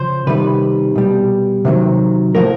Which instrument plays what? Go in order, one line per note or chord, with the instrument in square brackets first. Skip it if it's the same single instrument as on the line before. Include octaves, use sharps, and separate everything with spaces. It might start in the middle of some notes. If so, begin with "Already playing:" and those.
Already playing: [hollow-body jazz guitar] C#3 F3 C5
C3 D#3 G3 B4
B2 G3
C3 D#3 F#3
A2 F3 A#4